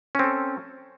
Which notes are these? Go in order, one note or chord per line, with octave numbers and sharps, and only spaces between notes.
C4 C#4 A4